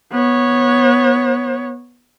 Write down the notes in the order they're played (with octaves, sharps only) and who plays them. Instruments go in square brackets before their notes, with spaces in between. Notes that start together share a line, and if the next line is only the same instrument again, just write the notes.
[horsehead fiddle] B3 C#5